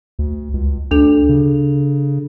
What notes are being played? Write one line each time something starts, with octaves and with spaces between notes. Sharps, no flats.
D2
C#2
D2 D4 A4 F7
C#3